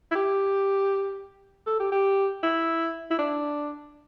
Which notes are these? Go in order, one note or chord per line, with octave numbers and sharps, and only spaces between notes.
E4
G4
A4
G4
G4
E4
E4
D4